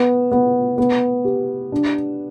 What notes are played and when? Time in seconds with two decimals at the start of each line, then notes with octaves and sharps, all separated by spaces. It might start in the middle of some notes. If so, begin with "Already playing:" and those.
Already playing: B3
0.32 B3
0.78 B3
1.25 G4
1.72 D4